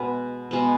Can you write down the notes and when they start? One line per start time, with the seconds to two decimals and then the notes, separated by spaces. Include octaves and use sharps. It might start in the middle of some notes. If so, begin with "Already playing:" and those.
Already playing: B2 G#3 B3 B4
0.51 B2 G#3 B3